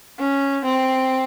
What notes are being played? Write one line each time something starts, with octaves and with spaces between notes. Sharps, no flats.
C#4
C4